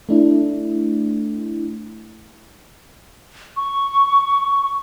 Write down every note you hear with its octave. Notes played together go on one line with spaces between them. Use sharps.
A3 D4 E4
C#6